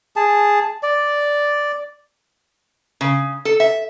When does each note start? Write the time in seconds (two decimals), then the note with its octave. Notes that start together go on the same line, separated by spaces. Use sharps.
0.16 G#4 A5
0.83 D5
3.01 C#3
3.45 A4
3.60 E5